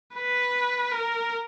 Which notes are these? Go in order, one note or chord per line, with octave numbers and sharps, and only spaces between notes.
B4
A#4